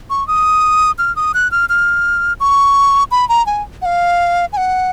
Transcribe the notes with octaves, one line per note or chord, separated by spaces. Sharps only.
C#6
D#6
F6
D#6
F#6
F6
F6
C#6
B5
A#5
G#5
F#5
F5
G#5
F#5